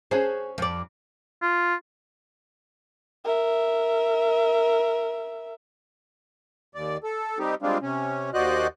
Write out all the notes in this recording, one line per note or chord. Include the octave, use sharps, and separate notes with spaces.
C#4 F#4 G#4 C5
F2 D5
F4
A#4 E5
D#2 D5
A4
G3 C4 D#4 G4
G3 G#3 C4 D4 F4
C3 C#4
D#2 F#4 C5 D5 D#5 F#6